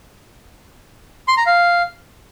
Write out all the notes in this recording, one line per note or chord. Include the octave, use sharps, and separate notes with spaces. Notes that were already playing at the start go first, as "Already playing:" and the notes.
C6
A#5
F5